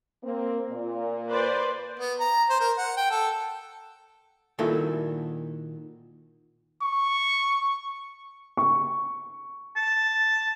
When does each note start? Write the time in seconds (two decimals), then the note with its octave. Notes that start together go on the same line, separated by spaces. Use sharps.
0.23 A#3 C4
0.71 A#2
1.30 B4 C5 D5
1.99 B3
2.20 A#5
2.49 C5
2.60 A#4
2.78 F#5
2.97 G5
3.10 A4
4.59 A#2 D#3 E4 F#4 A4
6.82 C#6
8.57 C#6
9.76 A5